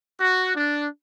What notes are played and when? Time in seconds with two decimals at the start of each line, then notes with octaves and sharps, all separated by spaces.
0.20 F#4
0.55 D4